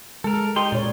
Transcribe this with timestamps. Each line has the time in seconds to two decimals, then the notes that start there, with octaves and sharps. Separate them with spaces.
0.24 G#3 A4 A#4
0.56 D#4 G4 C6
0.72 A#2 C#5 D5